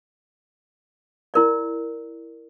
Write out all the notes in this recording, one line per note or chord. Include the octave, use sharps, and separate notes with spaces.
E4 A#4 D5